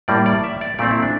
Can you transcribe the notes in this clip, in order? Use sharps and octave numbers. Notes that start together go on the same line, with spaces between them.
A2 G3 A#3 D5
D5
E5
D5
A#2 A3 C4 D5
E4
D4